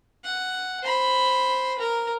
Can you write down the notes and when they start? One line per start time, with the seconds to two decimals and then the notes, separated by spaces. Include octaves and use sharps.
0.24 F#5
0.83 C5 B5
1.79 A#4